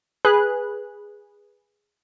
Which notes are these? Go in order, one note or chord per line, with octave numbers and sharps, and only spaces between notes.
G#4 B4 F#6